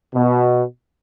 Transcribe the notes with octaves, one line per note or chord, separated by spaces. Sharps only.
B2